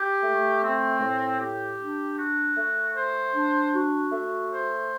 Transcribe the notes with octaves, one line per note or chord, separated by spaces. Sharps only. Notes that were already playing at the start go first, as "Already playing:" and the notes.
Already playing: G4
A3
C4
A2
G4
D4
F#4
A3
C5
D4
F#4
A3
C5